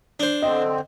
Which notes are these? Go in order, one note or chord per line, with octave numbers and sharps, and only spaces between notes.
D4 C5
D3 C4 D#5